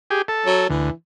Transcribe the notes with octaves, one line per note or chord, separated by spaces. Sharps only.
G4 G#4
A4
F#3
D2 E3